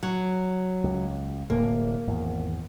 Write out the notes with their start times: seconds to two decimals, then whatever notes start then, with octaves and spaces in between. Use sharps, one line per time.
0.03 F#3
0.84 C#2
1.50 D1 A2 C3 A#3
2.07 G#1 E2